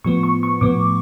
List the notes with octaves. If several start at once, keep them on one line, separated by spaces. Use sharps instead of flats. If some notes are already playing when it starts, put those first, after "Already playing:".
A2 F3 B3 C#6
C#6
C#6
A2 F3 B3 D6